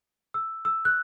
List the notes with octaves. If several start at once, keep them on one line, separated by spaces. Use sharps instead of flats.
E6
E6
F#6